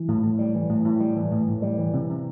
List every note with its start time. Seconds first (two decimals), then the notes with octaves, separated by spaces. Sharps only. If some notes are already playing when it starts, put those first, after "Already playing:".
Already playing: E3
0.08 A2
0.23 A2
0.39 G3
0.55 E3
0.69 A2
0.85 A2
1.00 G3
1.16 E3
1.31 A2
1.48 A2
1.62 G3
1.78 E3
1.93 C3
2.09 C3